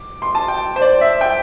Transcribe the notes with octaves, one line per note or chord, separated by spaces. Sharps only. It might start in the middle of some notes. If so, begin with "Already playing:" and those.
Already playing: D6
C6
A5
G5
C5
D5
E5
G5